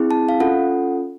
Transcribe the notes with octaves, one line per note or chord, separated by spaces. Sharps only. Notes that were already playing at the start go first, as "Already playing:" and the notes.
Already playing: C4 E4 G#4
A5
F5
C#4 F4 A4 F#5